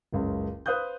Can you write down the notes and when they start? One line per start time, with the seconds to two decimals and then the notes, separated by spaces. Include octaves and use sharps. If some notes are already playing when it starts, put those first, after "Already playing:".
0.13 F#1 C#2 C#3
0.66 B4 C5 F5 D#6 F#6 G6